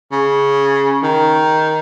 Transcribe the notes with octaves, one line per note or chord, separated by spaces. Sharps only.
C#3
D#3